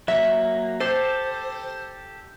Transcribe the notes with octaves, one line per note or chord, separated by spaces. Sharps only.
F#3 A#3 E5
G4 A4 C5